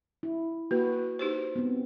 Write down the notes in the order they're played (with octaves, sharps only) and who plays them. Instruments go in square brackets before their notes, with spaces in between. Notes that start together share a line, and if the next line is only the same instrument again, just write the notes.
[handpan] E4
[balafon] A#3 [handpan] F#4 B4
[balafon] D#4 G4 C5
[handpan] B3 C4